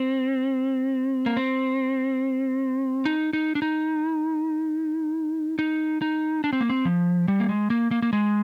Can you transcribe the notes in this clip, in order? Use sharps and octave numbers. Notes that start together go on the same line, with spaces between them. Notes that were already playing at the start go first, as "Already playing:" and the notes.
Already playing: C4
A#3
C4
D#4
D#4
D4
D#4
D#4
D#4
D4
C4
A#3
C4
F3
G3
A#3
G#3
A#3
A#3
A#3
G#3